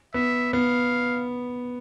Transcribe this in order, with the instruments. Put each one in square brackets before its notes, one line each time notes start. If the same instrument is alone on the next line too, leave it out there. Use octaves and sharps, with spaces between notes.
[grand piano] B3 [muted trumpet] E5
[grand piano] B3 [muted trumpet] F5